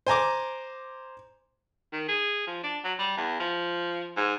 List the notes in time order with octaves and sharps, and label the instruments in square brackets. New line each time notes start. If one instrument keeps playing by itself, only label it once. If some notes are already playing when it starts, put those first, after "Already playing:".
[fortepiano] C5 G#5 A#5 D6
[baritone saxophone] D#3
G#4
F3
D4
F#3
G3
E2
F3
G#2